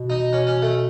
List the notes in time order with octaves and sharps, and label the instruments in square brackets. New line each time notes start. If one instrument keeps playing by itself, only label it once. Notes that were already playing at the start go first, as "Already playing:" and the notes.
Already playing: [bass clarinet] B2
[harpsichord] D#4
C#4
C#4
A3